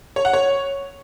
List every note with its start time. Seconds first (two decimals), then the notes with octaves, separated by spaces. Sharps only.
0.16 C#5
0.25 F#5
0.33 C#5